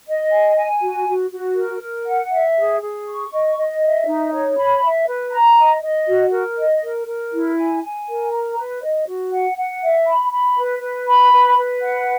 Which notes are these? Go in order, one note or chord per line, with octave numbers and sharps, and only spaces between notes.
D#5
G#5
G#5
F#4
F#4
F#4
A#4
A#4
F#5
E5
G#4
G#4
C#6
D#5
D#5
E5
D#4
C#5
B5
E5
B4
A#5
D#5
D#5
F#4
A#4
D#5
A#4
A#4
E4
G#5
G#5
A#4
A#5
B4
D#5
F#4
F#5
F#5
E5
B5
B5
B4
B4
B5
B4
B4
F#5